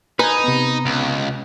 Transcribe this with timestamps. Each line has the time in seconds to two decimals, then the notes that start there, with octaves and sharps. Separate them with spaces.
0.19 D#4 B4 G#5 G#6
0.44 C3 B3
0.86 C#2